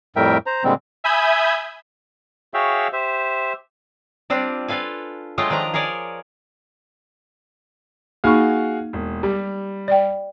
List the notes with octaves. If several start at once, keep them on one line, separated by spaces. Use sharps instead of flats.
F2 A2 G3 A#4 E5 G5
C5 A#5
A#2 D3 G3 G#3 C4
E5 G#5 B5 D#6 G6 G#6
F#4 G#4 C#5 E5 F5 G5
G4 C5 E5
G3 C4 D4 F4
F4 A4 B4 F5 G#5
F#3 G#3 A3 F4 D#5 G5
D#3 F3 D4 D#5 A#5
G#4 A#4 C#5 D5 G#5
A#3 D#4 F#4 G#4 F5 C#6
E1
G3 G4
D5 G5